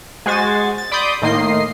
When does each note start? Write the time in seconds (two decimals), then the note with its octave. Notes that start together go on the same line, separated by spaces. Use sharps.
0.26 G#3 F#4 C5 G#5 A6
0.78 A6
0.92 D5 B5 C6 D6 D#6 G6
1.22 A2 D#3 A#3 D#5 C6 C7